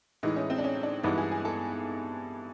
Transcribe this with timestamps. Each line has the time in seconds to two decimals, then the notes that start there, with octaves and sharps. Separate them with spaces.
0.23 A2 E3 G#3 D#4
0.36 C#4
0.50 C4
0.58 D4
0.64 C#4
0.83 D4
1.03 G2 E3 G#3 B3 D#4
1.18 G#4
1.31 G#4
1.45 A4